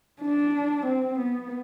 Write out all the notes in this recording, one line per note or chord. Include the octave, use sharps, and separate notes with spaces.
D4
C4
B3